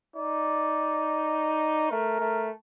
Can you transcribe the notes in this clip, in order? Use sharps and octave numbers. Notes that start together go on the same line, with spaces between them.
D#4 D5
A3 A#4
A3